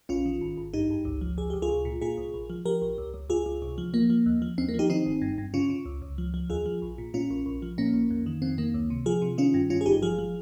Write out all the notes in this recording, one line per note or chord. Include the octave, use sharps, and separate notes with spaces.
A#1 C#4 F4
D#3
G#1
G#1
G2 D#4 G4
G#1
C#2
F3
C#2 G#4
C#2 G4
F4 G#4
C2
A#2
A#2 F4 G#4
C2
A#1
F3
F3 G4 A#4
A#1
C#2
C#2
C#2 F4 G#4
C#2
C2
F3
F3 A#3
F3
D#2
F3
D#2 C4
A#3
F3
D#4 G4
D#3 C4 D#4
G1
G2
G2
C#3 C#4 F4
C#3
C#2
C#2
F3
F3
D#2 F4 G#4
F3
A#1
A#2
A#2 C#4 F4
A#1
A#1
F3
A#2 A#3 C#4
A#1
F2
D#3
F2 C4
D#3 A#3
C#2
C3
F3 F4 G#4
C3
D#3 C#4 F4
G2
G2 C#4 F4
G#4
G#1 D#4 G4
F3 F4 G#4
F3